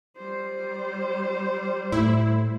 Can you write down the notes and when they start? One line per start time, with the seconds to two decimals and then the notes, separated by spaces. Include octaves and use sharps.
0.17 G3 C5
1.92 A2 E4